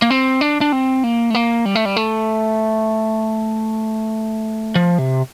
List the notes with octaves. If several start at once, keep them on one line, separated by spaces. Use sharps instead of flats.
A#3
C4
D4
D4
C4
A#3
A3
A#3
G3
A3
G3
A3
F3
C3